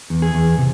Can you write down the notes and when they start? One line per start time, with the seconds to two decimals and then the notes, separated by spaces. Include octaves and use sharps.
0.10 E2
0.22 G#4
0.35 E2
0.58 C3